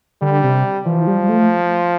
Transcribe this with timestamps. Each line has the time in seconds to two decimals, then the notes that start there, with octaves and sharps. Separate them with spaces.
0.22 D3 G3
0.44 C3
0.86 E3 F3
1.07 G3
1.22 G3
1.29 A3